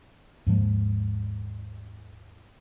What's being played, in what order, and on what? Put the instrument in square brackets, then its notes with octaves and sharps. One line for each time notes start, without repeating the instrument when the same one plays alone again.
[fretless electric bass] D#2 G#2 F3 G#3